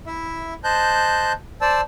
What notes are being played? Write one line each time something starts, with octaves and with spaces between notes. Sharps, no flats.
E4 E5
C5 D#5 A5 F#6 G6
C5 D5 A5 E6